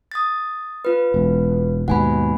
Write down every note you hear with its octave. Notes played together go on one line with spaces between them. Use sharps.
D#6 A6
F4 B4
E1
D#2 G#2 B2 F#5 G#5 B5